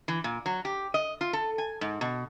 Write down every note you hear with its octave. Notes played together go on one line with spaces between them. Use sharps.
E3
A#2
F#3
G4
D#5
F4
A4
G#5
G#2
B2